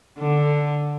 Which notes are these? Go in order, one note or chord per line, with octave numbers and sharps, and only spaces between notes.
D3